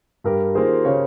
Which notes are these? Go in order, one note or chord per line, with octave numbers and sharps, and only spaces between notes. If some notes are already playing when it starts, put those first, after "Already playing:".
G2 G4 A#4
D#3 A#3 F4 G#4 C5
C#3 A#4 C#5